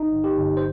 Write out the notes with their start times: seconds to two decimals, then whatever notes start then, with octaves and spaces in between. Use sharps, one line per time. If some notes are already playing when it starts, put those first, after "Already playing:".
Already playing: G1 D#4
0.12 G1
0.24 G4
0.38 G1
0.57 C5